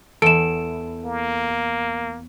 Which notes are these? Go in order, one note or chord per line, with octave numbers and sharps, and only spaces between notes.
E2 E4 A4 D7 E7
A#3